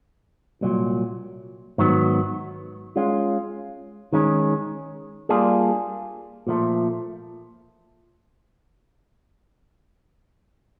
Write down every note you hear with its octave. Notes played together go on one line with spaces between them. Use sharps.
C2 A#2 F#3
G#2 D#3 F#3 B3
G#3 C#4 F4
D#3 G#3 C#4
G3 A#3 D4 F4 G#4
A#2 F3 A3